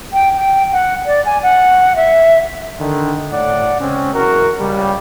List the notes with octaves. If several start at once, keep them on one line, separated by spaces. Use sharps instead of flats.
G5
G5
F#5
D5
G#5
F#5
E5
D3 D#3
A2 D5 F#5
C#3 G#3 C4 C#4
F#1 E2 F#4 A#4
C#2 G3